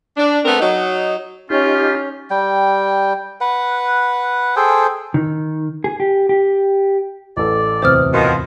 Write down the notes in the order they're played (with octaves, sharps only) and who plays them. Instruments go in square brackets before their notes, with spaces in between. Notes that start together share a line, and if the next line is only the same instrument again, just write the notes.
[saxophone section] D4
A3 B3 C4 A#4
F#3 D#4
[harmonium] C#4 [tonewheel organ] D#4 G4 [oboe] F4
[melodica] G3 G5
B4 F#5
G#4 A4 C5 G5
[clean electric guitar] D#3
G#4
G4
G4
[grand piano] A1 A4 [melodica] D5
[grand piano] D1 E2 C3 [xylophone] C5 D#6 F6
[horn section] B2 D#3 [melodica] F4